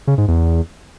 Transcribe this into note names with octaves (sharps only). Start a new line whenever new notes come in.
C#3
G#2
E2